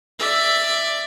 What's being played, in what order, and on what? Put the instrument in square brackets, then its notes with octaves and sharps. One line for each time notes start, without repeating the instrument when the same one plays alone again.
[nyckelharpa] D5 E5